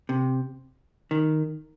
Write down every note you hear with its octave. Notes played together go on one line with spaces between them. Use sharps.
C3
D#3